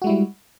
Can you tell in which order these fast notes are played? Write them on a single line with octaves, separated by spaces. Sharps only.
F#4 G#3 E4 G3